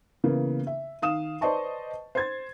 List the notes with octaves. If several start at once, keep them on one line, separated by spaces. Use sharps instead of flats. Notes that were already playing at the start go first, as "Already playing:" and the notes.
C#3 E3 A#3 B3
E5
D#3 F5 D#6 E7
B4 C5 D5 D#5 A5 C#6
C5 G#6 A6